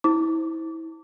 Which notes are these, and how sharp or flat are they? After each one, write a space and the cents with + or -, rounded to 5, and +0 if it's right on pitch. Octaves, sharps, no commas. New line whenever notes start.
E4 -25 C5 +0 D6 -25